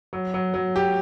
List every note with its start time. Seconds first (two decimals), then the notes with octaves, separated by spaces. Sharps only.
0.13 F#3
0.34 F#3
0.54 F#3
0.76 G4